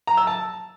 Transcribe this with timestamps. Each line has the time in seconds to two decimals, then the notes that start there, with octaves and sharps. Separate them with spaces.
0.07 A#5
0.17 E6
0.27 A5